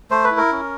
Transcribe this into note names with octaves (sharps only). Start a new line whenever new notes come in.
A3 C5
B4
E4
A#4
C#4